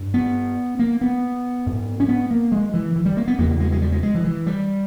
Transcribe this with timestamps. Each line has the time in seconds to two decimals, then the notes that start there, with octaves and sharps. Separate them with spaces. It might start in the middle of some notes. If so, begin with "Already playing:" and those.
Already playing: G2
0.14 B3
0.79 A#3
1.01 B3
1.66 G#2
2.00 C#4
2.08 B3
2.31 A#3
2.52 G#3
2.74 E3
2.96 E3
3.06 G3
3.17 A#3
3.28 B3
3.38 E2 C#3 A#3
3.60 G#3
3.72 G#3
3.82 G3
3.92 G#3
4.03 G#3
4.15 E3
4.25 E3
4.47 G3